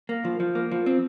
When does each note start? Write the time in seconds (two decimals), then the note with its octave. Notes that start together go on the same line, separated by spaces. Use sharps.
0.09 A#3
0.25 F3
0.40 F3
0.55 A#3
0.71 F3
0.86 C4